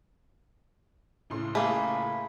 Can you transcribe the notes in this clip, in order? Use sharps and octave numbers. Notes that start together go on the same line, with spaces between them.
C#2 A2 C6
A3 A#3 G#4 B5